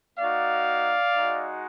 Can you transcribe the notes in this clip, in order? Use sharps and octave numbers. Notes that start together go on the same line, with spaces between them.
A#3 D#4 F#4 D5 F5
G#3 D#4 F#4